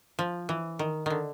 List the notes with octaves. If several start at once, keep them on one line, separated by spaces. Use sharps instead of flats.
F3
E3
D#3
D3 D#3